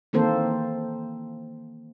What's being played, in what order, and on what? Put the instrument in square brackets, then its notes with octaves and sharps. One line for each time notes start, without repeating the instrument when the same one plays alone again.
[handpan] D#3 E3 A#3 C4 A4 C5